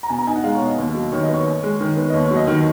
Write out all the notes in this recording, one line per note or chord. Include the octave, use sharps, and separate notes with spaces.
A#5
B2 G#5
A#5
D#4 G#5
F#5
G#3 F5
C#5
B2
D#5
D#2
F#3
D#3 C#5
D#5
B3
C#5
F#2
G#3
D#3
B3
D#5
D#2 C#5
C#5
F#3
D#5
D#3